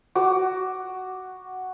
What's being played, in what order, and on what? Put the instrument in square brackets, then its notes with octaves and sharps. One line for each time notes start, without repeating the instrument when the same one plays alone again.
[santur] F#4 D6